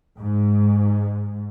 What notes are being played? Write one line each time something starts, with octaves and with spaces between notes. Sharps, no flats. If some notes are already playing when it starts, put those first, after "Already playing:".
G#2